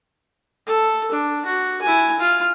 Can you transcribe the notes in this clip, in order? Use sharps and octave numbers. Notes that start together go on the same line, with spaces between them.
A4
D4
F#4
E4 G#5
F4